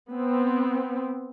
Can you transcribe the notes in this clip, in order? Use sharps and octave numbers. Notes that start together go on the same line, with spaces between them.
B3 C4